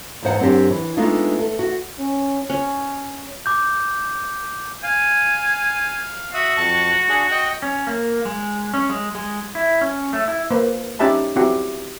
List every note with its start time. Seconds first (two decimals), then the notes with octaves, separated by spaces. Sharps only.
0.23 E2 G#2 C5 F#5
0.39 F#2 C4 D4 G4
0.71 E3
0.97 G#3 A3 B3 D4 D#4 F4
1.39 A4
1.59 F#4
1.99 C#4
2.50 C#4
3.46 D6 G6
4.83 F5 G#5
6.34 F#4 E5 D#6
6.57 F2 A5 C#6
7.09 D4 G#4
7.31 D#5 G5
7.62 C#4
7.87 A#3
8.25 G#3
8.74 C#4
8.89 G#3
9.15 G#3
9.55 E4
9.81 C#4
10.13 A3
10.28 E4
10.51 A#3 B4 C5
10.99 C#4 D#4 G4 E5 A5 B5
11.36 C4 E4 F#4 G4